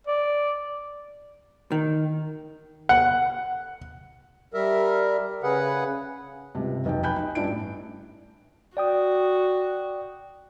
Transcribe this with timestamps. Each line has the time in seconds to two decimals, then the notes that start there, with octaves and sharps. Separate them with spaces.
0.07 D5
1.72 D#3
2.89 F#5
4.54 G3 A#4 E5
5.43 C#3 G#4 B4 F#5
6.55 C#2 G2 C3
6.85 F1 B1 D#4 G5
7.03 G5 G#5 B5 F#6 G6
7.16 D#4
7.35 G2 C#4 D4 E4 D7
7.47 A2
8.77 F#4 D5 G5 D#6